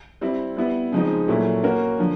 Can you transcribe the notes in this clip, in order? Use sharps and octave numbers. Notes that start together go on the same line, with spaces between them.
G3 C4 E4
G3 B3 E4
C#3 F3 G#3 C4 D#4
A#2 F#3 A3 C#4 E4
A#3 C#4 F#4 A#4
D3 F3